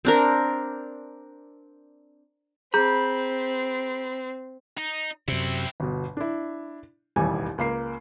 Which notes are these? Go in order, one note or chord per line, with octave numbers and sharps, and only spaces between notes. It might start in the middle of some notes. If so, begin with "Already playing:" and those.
C4 D4 A#4
C4 G#4 A#5 B5 G6
D#4
F#2 C3 C4 E4
G1 B2
D4 E4
E1 A1 D#2 G3 G#5
C#2 A#3 C7